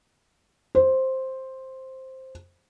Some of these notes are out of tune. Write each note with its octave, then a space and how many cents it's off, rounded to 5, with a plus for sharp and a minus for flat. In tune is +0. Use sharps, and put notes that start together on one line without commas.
C5 +5